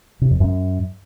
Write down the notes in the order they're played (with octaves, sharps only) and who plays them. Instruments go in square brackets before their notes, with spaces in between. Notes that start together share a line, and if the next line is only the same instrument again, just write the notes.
[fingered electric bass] C3
F2
F#2